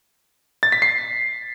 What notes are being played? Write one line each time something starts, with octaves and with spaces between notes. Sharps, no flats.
A6
B6
C7